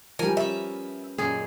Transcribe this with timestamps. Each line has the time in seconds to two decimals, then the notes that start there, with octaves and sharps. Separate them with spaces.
0.19 F3 G3 A#4 G#5
0.37 B3 C#4 E5
1.18 F#2 A#2 D#3 G#4